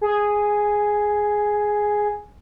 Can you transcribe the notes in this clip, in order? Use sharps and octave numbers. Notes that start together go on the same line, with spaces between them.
G#4